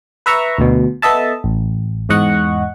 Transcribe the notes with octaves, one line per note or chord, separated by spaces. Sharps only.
B4 E5 A#5 C#6
D2 B2
B3 A4 D#5 E5 A5
A1
E2 G#2 D#5 F#5 C#6